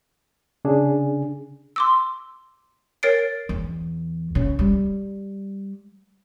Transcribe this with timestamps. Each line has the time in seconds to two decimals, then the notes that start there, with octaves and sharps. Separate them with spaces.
0.65 C#3 D4 G#4
1.76 C6 D6 E6
3.03 A#4 C#5 A6 C7 D7
3.49 E2
4.35 C#3
4.59 G3